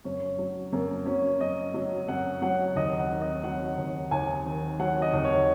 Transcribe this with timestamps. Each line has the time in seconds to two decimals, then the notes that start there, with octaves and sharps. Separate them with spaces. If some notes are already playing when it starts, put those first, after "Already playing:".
0.04 F#2 C#4
0.38 F#3
0.72 F#2 A#3
1.06 F#3 C#4
1.41 F#2 D#5
1.74 F#3
2.08 F#2 F#5
2.42 F#3 F#5
2.75 D#2 D#5
2.99 F#5
3.10 D#3
3.22 D#5
3.43 F#3 F#5
3.77 D#2
4.11 D#2 G#5
4.45 D#3
4.79 F#3 F#5
5.02 D#5
5.13 D#2
5.25 C#5